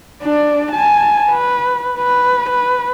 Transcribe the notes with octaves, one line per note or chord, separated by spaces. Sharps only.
D4 D5
G#5 A5
B4
B4
B4